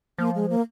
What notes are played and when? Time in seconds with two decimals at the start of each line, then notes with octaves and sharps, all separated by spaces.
0.18 F3 A#3
0.35 G#3
0.50 A#3